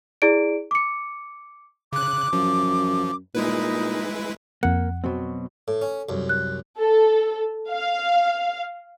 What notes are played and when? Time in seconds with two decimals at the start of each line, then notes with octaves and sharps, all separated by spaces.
0.22 E4 G#4 D5 D7
0.71 D6 C#7
1.93 C#3 D6 F#6
2.33 F#2 F3
3.35 A#2 G#3 D#4 E4 B4
4.63 F2 A#3 F#5
5.04 B2 F#3 C4
5.68 A2 A4
5.82 C#4
6.09 C2 F#2
6.29 F#6
6.79 A4
7.69 F5